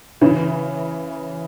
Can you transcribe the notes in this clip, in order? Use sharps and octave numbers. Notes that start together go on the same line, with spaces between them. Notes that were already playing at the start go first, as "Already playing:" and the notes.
C#3 E3